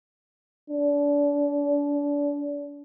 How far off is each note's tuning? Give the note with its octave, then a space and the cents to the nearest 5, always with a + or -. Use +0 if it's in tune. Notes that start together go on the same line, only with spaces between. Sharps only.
D4 -30